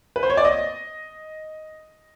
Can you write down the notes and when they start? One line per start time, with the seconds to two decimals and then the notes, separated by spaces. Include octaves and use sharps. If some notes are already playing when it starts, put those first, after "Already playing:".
0.16 B4
0.23 C5
0.30 C#5
0.37 D5
0.45 D#5